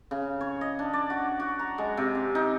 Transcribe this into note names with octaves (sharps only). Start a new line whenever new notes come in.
C#3
C#5
D#5
D4
D5
F#4
F#4
A#5
G#3
C3
G4
D#4